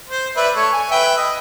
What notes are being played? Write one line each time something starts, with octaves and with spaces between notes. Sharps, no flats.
C5
B4 D5 E5
A3 C#5
G#5
B4 E5 G5
D#5